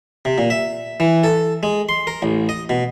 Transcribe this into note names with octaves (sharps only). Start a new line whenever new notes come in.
C3
A#2
E5
E3
A4
G#3
C6
A#4
A1
D#5
B2